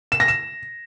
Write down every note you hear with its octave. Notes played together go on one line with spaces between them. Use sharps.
E7
A#6
E7